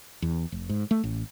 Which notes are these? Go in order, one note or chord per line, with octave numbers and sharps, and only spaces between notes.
E2
F1
G#2
A3
A1